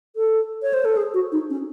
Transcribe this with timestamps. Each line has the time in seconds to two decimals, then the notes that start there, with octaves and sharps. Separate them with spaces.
0.16 A4
0.62 C#5
0.73 C5
0.85 A4
0.97 G#4
1.14 F#4
1.32 D#4
1.50 C#4